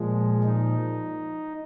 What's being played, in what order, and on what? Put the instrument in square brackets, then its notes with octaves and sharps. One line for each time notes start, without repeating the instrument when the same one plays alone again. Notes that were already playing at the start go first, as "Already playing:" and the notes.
Already playing: [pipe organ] A#2 F3 G#3
D#4